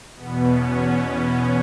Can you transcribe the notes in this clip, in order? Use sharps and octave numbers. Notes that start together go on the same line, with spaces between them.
E2 B2 B3
C#4
C#4